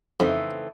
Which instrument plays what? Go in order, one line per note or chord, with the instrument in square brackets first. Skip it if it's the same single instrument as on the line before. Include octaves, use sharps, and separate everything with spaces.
[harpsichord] F2 [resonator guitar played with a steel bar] C#3 E3 A3 C4 D#4